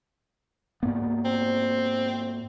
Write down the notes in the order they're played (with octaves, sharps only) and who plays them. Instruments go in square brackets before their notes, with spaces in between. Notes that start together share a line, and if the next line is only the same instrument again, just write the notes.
[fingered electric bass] G#2 A#3 B3
[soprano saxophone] C4